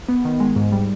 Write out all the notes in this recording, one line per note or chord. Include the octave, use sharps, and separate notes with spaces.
B3
D#3
G#3
G#2
G3